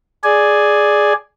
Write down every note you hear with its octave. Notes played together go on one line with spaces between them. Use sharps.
G#4 D5 G#5